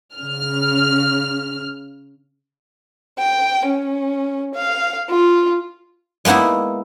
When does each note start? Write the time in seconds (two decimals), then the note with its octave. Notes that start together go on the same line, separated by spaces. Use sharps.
0.15 C#3 F6
3.19 G5
3.66 C#4
4.55 F5
5.10 F4
6.25 G#3 A#3 B3 D#4 E4